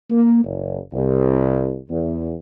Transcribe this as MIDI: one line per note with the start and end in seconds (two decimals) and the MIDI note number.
0.11 0.44 58
0.44 0.78 30
0.92 1.76 36
1.90 2.33 40